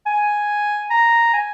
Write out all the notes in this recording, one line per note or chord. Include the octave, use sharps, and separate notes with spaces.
G#5
A#5
G#5